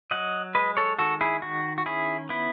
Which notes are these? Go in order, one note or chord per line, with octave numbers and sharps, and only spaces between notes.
F#3 D#5 F#5
G#3 B4 D#5
A4 C#5
D#3 F#4 A4
E4 G#4
D#3 F#4
F#4
C#4 E4 G#4
B3 E4